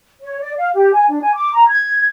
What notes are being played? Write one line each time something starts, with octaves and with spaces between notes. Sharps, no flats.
C#5
D5
F5
G4
G#5
D4
G#5
D6
A#5
G#6